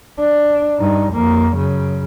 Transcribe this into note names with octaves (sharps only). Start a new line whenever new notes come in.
D4
G2 D#4
F2 A#3
F#2 C#3